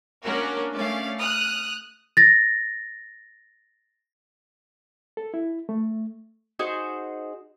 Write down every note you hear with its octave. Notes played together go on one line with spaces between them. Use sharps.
A#3 C#4 D4 F#4 A#4
A3 C#4 D5 F5
D#6 F6 F#6
A6 A#6
A4
E4
A3
D#4 F#4 G#4 C5